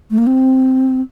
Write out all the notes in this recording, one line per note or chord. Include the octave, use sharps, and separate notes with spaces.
A3
A#3
C4